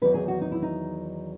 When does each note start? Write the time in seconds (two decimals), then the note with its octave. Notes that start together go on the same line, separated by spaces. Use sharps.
0.01 E2 D#3 F#3 B4
0.14 G#4
0.28 F#4
0.41 D#4
0.52 E4
0.62 D#4